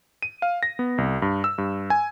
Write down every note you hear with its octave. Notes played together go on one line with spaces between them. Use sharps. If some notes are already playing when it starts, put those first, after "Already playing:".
D#7
F5
A#6
B3
C2
G2
E6
G2
G#5